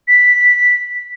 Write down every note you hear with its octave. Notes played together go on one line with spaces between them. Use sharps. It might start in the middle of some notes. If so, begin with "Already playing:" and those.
B6